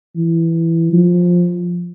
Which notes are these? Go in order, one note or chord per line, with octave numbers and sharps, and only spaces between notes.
E3
F3